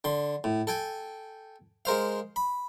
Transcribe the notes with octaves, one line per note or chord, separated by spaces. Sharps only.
D3 C6
A2
A4 G5 G#5
G#3 A#4 C5 F5
B5